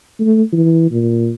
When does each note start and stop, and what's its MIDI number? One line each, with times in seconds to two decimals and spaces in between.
0.19 0.42 57
0.52 0.91 52
0.91 1.31 46